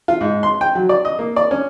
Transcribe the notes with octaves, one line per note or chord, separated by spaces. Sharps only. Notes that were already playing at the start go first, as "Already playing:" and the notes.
F4
G#2
C6
G5
F#3
D5
D#5
A#3
D5
C#4